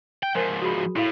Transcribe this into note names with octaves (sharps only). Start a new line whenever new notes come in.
G5
G#2 F3 A#4 C5 G#5
F#4 G#4 B5
F#4
A2 E4 F5